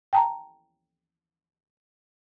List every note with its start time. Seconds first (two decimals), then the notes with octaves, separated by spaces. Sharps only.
0.13 G5 A5 A#5